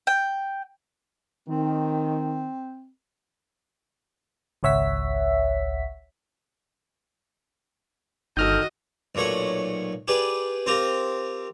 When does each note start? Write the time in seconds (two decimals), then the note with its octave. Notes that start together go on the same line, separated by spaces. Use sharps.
0.07 G5
1.48 D#3 C4
4.63 G#1 C#2 C#5 E5 F#5 B6
8.37 G1 D#3 F#4 A4 D#5 E6 F6 G6
9.15 B1 A#2 A3 C#5 F#5
10.08 G4 G#4 B4 D5
10.66 C4 F4 G4 A#4